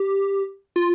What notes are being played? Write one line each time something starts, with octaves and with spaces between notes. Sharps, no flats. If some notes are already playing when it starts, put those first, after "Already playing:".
Already playing: G4
F4